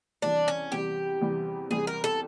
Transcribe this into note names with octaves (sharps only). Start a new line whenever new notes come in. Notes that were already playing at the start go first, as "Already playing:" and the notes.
E2 C3 E3 G3 D4
C#4
E2 C3 E3 G3 G4
E2 C3 E3 G3
E2 C3 E3 G3 G#4
A#4
A4